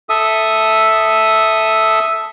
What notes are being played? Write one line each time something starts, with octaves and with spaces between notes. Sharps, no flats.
A4 E5 D#6